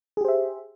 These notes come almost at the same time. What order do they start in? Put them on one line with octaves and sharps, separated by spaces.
G#4 G4 C5 E5